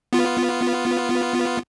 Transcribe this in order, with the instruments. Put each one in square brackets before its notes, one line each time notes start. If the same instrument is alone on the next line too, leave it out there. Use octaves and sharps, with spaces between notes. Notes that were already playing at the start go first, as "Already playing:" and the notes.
[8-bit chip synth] B3 F4